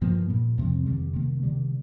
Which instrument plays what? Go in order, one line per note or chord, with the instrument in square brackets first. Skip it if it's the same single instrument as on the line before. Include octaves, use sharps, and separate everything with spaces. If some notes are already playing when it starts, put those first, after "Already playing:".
[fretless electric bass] G2 F3 A#3
A#2 G3 A#3
F2 C3 F3 C4
F2 D#3 G3
C3 D#3 A#3
C3 D#3 G3